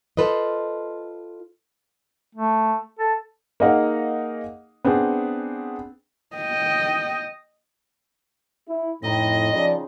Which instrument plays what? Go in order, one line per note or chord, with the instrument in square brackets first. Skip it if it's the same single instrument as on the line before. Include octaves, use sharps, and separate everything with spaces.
[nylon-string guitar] F4 A4 B4 C5 D#5
[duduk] A3
A4
[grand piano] A#3 D#4 G#4 D#5 F5 F#5
B3 C4 D4 G#4
[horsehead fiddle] D#5 G5
[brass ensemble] E4
[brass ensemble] F2 A2 [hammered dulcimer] C4 D#4 B4 [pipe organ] D#5
[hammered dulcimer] C#3 [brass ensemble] F3 D5